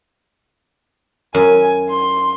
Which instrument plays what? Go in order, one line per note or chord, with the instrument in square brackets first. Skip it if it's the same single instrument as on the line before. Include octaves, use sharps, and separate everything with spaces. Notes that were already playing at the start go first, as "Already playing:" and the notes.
[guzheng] F#2 [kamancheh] G#5
[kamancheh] C6